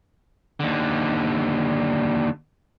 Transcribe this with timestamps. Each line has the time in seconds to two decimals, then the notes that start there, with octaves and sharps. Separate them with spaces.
0.60 D#2 D3